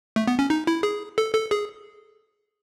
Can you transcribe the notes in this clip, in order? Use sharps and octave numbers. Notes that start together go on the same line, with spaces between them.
A3
B3
C#4
D#4
E4
G#4
A4
A4
G#4